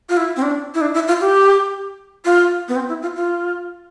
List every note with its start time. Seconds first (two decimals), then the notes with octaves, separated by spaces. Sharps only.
0.09 F4
0.17 E4
0.37 C4
0.43 D4
0.75 E4
0.81 D4
0.94 E4
1.08 F4
1.21 G4
2.25 F4
2.68 B3
2.76 C4
2.89 E4
3.02 F4
3.16 F4